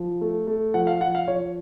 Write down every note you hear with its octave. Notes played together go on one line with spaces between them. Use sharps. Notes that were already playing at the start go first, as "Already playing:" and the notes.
Already playing: F3
A3
A3
F3 F#5
F5
F3 F#5
F5
F3 C#5